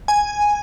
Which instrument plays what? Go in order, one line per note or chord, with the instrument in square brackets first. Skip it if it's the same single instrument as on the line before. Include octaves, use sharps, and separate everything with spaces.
[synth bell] G#5